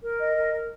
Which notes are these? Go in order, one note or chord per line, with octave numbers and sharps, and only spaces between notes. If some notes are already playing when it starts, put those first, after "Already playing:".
A#4
D#5
A#4
A#4